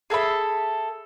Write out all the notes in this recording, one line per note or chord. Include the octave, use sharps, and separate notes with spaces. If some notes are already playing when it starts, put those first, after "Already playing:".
G#4 A4 E5 B5